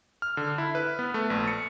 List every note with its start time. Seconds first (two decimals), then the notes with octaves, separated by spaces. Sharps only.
0.22 F6
0.37 D3
0.58 E4
0.75 B4
0.99 B3
1.14 A3
1.30 A#1
1.47 C#7